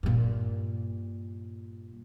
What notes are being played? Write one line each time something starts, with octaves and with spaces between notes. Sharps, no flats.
G2 A#2